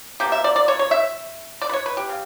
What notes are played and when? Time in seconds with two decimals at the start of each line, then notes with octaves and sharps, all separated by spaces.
0.20 B2 A#3 G4
0.32 E5
0.44 D5
0.56 D5
0.68 C#5
0.79 C#5
0.91 E5
1.62 D5
1.69 B4
1.73 C#5
1.86 B4
1.97 G4
2.09 C#3